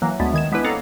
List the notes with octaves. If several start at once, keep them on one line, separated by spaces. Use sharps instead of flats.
E3 F#3 A#3
D2 G#3 A3 B3
D#3 G#6 E7
G#3 B3 D4 E4 B4
A#3 C4 A4 C#5 F5 F#5